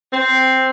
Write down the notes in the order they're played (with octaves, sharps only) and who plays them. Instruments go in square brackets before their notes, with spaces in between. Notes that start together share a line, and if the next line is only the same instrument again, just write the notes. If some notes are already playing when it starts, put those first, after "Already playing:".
[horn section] C4